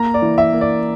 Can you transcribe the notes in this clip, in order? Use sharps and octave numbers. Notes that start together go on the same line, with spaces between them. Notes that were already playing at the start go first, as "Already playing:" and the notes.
Already playing: A#3 A#5
D5
E3
E5
A#3
D5